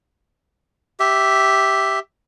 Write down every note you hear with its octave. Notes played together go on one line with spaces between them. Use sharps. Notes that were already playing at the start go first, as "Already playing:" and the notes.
G4 E5